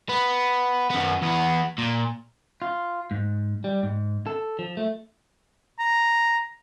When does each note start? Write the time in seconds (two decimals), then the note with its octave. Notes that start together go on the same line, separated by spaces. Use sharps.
0.09 B3
0.90 F#2 B3
1.22 E2 B3
1.78 A#2
2.62 F4
3.11 G#2
3.64 G3
3.83 G#2
4.27 A4
4.59 F3
4.77 A3
5.79 A#5